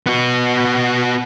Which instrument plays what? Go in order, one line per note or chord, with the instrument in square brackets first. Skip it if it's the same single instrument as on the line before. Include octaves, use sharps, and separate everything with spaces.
[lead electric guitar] B3 F#4